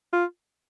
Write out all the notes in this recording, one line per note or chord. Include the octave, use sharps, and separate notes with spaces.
F4